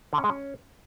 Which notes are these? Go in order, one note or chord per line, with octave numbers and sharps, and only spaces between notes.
D3
C#4
G#3
C#4